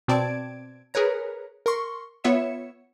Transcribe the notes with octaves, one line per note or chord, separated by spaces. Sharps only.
B2 C4 D5 A5 G#6 D7
G#4 A#4 B4 C#5 A#5
A#4 C6 C#6
B3 F4 C#5 E5 C#7 E7